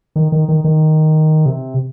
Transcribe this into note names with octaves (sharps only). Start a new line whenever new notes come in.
D#3
D#3
D#3
D#3
C3